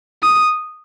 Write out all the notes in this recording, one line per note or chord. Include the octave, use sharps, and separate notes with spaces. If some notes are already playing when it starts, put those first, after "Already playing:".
D#6